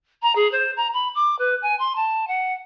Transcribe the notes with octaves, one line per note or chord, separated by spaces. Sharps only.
A#5
G#4
C5
A#5
B5
D6
B4
G#5
C6
A5
F#5